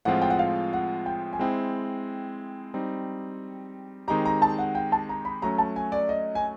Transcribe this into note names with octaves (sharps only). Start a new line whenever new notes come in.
A2 F3 G#3 C4 F4 F#5
G5
F#5
F5
F#5
G5
G#5
G#3 C4 E4 G5
G3 C4 D#4
D#3 G#3 C4 D#4 G4 A#5
A#5
A5
F#5
G5
A5
A#5
B5
F#3 A3 C#4 A#5
A5
G#5
D5
D#5
G#5